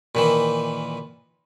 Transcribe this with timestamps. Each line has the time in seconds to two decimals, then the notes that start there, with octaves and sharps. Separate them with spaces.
0.15 A#2 D#3 E3